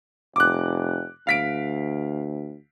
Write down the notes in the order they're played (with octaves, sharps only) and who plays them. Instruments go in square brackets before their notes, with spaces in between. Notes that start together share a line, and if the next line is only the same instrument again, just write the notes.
[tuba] F1 [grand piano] D6 F#6
[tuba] D2 [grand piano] F5 B6 D7